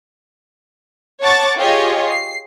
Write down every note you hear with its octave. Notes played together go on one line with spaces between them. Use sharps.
C#5 F#5 A5 C#6 D6 A6
F4 G4 G#4 C#5 D#5
C7